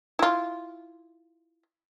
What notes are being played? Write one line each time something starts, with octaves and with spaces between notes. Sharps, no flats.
E4 F4